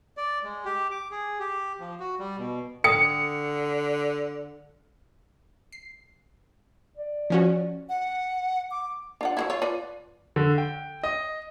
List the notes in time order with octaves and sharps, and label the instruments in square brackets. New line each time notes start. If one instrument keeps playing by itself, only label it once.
[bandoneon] D5
G#3
G4
D6
G#4
G4
F3
F#4
G3
B2
[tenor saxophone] D3 [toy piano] A4 G5 D#6 [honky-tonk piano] C#7
[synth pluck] C7
[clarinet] D5
[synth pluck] F3 C#4 F#4
[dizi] F#5
D6
[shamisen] D4 F4 F#5
F#3 A#3 E4
F4 C#5
F4 B4 D5
[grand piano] D3
G5
D#5